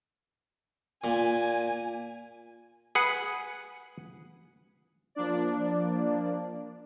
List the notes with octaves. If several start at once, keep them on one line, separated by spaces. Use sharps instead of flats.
A#2 G#5
G#4 B4 F#5
F3 A#3 D4 D5